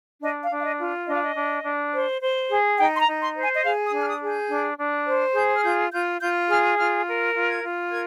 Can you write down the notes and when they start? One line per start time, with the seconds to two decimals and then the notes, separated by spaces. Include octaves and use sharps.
0.21 D4 D#5
0.43 F5
0.51 D4
0.60 F5
0.64 D#5
0.79 F4
1.07 D4 D#5
1.14 F5
1.22 D#5
1.35 D4
1.64 D4
1.93 C5
2.21 C5
2.50 G#4
2.79 D#4 G5
2.96 C6
2.99 A#5
3.07 D#4
3.21 C6
3.36 C5
3.42 G#5
3.54 D#5
3.64 G#4 F5
3.86 D#6
3.92 D4
4.01 F6
4.07 D#6
4.21 G#4
4.28 G6
4.49 D4
4.78 D4
5.06 C5
5.35 G#4 G6
5.54 F6
5.63 F4 G6
5.92 F4 G6
6.21 F4 G6
6.49 G#4 F6
6.78 F4 F6
7.06 A#4
7.34 F4
7.49 G#6
7.63 F4
7.91 A#4 G#6